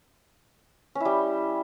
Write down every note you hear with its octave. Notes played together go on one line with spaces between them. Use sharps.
G3 C#4 E4